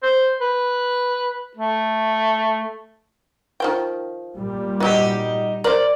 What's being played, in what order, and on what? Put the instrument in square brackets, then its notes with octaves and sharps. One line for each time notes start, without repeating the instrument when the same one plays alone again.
[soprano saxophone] C5
B4
A3
[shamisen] D#3 F3 G5
[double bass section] A#2 G3
[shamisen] F#3 B3 [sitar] D#4 G4
[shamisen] A#4 C5 [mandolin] D5